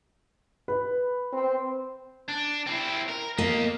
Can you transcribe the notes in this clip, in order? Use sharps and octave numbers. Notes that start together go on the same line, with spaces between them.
B4
C4
D4
C4 E4
A#4
A#3 D#5 F5